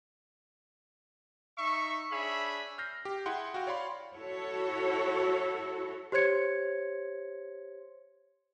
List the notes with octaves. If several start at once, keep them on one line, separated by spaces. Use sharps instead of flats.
D#4 E5 C#6
D4 G#4 C#5 E5 B5
F6 G6 A#6 C7
G4
E4 G#4 F#5 G5 C6
F#4 F5 G5
C#5 D5 F5 B5 C6
E4 F#4 A4 C#5
G4 C5 C#5 C6 G#6 C#7